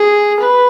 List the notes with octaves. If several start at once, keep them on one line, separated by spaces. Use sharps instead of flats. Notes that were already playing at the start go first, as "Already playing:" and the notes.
Already playing: G#4
B4